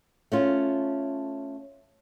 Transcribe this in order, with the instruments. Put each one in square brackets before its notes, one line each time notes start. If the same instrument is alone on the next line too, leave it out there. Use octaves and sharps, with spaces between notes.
[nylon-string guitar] A3 C#4 F4